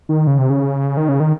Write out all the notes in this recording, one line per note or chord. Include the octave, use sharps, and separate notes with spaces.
D#3
C#3
C3
C#3
D#3
C#3
D#3